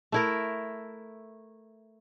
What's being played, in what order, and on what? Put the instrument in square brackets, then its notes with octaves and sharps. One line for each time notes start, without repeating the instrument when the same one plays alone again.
[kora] A3 E4 A#4